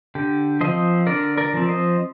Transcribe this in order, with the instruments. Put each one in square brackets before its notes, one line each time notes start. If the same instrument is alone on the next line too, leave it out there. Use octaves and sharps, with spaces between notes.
[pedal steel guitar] D3 G4
F3 C4 C5 D#5
D3 A#4 D5
A#4 D5
F3 C4
C5 D#5